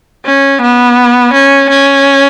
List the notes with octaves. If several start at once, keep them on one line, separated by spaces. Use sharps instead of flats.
C#4
B3
C#4
C#4